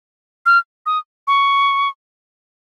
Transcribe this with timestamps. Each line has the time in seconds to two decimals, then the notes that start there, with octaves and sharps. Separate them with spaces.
0.46 F6
0.86 D#6
1.27 C#6